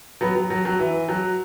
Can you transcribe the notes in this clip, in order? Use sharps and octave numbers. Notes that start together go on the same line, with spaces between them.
F#3 B3
F#3
F#3
F#3
E3
F#3